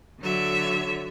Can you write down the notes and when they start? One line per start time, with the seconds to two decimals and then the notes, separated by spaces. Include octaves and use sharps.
0.21 D3 F#3 C#5 E5